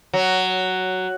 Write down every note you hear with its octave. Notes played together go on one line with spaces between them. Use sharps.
F#3